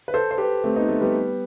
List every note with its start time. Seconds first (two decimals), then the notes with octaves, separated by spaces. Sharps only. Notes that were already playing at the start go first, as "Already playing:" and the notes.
0.08 B4
0.14 A4 C5
0.31 C5
0.38 G4 B4
0.64 A3 C4
0.76 B3 D#4
0.89 A3
1.01 G3 B3